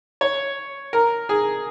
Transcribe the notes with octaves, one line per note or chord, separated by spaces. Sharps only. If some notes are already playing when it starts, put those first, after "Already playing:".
C#5
A#4
G#4